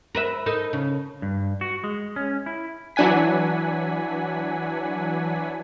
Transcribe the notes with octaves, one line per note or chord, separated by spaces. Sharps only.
A#4 B4 E5
D#4 A4 A#4
C#3
G2
F#4
G#3
C#4
E4
E3 F#3 D4 F#5 G#5 B6